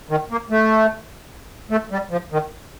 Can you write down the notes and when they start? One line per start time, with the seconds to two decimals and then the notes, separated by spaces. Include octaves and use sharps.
0.10 D#3
0.31 A#3
0.50 A3
1.70 A3
1.92 G3
2.11 F3
2.32 D#3